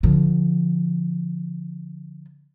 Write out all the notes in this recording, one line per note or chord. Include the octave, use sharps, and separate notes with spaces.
D3 F3